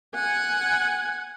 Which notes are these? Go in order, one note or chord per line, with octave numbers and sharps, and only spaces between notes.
F#5 G#5